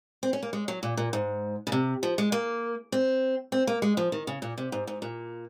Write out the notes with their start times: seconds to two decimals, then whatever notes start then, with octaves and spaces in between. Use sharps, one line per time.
0.23 C4
0.33 C#4
0.43 A#3
0.53 G#3
0.68 F#3
0.83 A#2
0.97 A#2
1.13 G#2
1.67 C#3
1.72 C3
2.03 F3
2.18 G#3
2.32 A#3
2.92 C4
3.52 C4
3.67 A#3
3.82 G#3
3.97 F3
4.12 D#3
4.27 C#3
4.42 A#2
4.58 C3
4.72 G#2
4.87 G#2
5.02 A#2